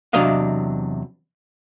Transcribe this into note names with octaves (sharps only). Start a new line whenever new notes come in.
E2 C3 F#3 D4 D#5 F5